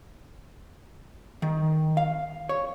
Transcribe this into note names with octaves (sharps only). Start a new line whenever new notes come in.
D#3
F5
C#5